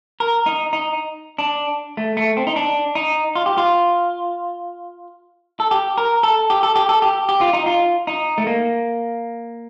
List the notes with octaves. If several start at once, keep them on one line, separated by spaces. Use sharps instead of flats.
A#4
D#4
D#4
D4
A3
A3
C4
D#4
D4
D#4
F4
G4
F4
A4
G4
A#4
A4
G4
A4
G4
A4
G4
G4
F4
D#4
F4
D#4
A3
A#3